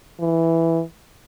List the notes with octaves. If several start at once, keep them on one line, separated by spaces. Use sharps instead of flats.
E3